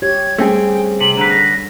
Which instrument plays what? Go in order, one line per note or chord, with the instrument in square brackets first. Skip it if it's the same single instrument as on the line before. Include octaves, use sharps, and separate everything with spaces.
[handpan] G4 C#5 [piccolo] G#6
[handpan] G3 C#4 [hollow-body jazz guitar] A3 C4 G#4 [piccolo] G5
[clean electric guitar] C3 [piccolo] F#7
[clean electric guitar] D3 B4 [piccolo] A#5
[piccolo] A#6